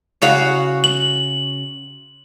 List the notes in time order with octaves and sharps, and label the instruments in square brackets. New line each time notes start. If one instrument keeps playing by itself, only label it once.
[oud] C#3 F#4 F5
[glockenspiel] F#7